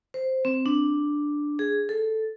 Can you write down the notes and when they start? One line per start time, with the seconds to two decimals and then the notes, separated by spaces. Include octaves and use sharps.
0.14 C5
0.45 C4
0.66 D4
1.59 G#4
1.89 A4